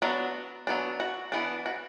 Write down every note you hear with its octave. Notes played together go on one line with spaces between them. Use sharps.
F#3 B3 D4 F#4
F#3 B3 D4
F#4
E3 B3 D4
F#4